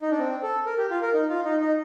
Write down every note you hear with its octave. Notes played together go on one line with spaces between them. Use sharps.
D#4
D4
C4
A4
A#4
G4
F4
A#4
D#4
F4
D#4
D#4